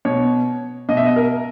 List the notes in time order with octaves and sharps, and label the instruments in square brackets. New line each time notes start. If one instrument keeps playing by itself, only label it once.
[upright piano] B2 C#5
B2 D#5
E5
D#5
A#4